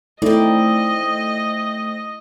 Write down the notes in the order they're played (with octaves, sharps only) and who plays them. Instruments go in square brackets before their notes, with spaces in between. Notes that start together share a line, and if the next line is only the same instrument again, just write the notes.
[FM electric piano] A3 [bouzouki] C4 D5 [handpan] D#4 E4 [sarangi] D#5